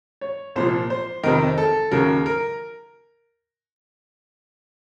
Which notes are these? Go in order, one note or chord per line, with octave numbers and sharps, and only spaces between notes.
C#5
C2 A#2 F3 C5
C5
F2 C3 D#3 A#4
A4
D#2 C#3 F#3 A#4
A#4